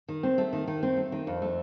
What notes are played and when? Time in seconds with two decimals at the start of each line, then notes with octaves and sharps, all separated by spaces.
0.08 D#3
0.23 C4
0.38 A3
0.53 D#3
0.67 D#3
0.83 C4
0.97 A3
1.12 D#3
1.27 F2
1.42 A3